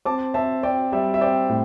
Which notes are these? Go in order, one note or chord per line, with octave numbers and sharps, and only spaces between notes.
C4 A5 D6
C4 E5 A5
C4 D5 G5
G3 E5
E5
C4 D5 G5
A2